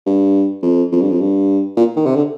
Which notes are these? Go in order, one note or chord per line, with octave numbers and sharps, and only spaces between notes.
G2
F2
F2
G2
F2
G2
A#2
D#3
C3
D3